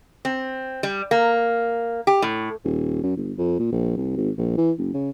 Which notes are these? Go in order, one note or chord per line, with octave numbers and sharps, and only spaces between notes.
C4
G3
A#3
G4
A2
D#1
F#2
G1
F2
A#2
A#1
C2
G#1
A#1
E3
F#1
C#3